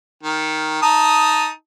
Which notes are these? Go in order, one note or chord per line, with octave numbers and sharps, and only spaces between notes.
D#3
D#4 A5 D#6